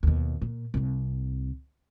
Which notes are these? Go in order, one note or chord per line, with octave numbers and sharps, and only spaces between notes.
D#2 B2
A#2
C2 C3